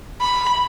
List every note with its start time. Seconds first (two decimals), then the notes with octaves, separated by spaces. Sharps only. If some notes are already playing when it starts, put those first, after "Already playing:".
0.21 B5